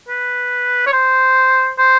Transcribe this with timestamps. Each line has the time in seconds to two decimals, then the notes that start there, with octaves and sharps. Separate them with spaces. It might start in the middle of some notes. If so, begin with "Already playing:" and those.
0.09 B4
0.87 C#5
0.93 C5
1.79 C5